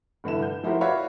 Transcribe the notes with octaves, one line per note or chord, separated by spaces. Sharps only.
F1 G2 D3 E4 E7
G6
F3 E4 F#4 G4 A#4 C5
F#4 B4 C#5 D5 E5 F5